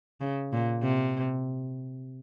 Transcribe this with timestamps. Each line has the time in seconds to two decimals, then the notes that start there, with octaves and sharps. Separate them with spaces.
0.21 C#3
0.53 A#2
0.83 C3